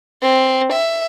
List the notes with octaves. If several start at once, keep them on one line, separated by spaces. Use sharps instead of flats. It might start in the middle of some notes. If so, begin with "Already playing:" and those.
C4
E5